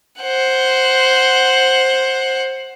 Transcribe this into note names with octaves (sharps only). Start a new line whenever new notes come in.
C5 F#5